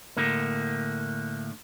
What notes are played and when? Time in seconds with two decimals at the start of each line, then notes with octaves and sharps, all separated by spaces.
0.17 A2 D3 A#3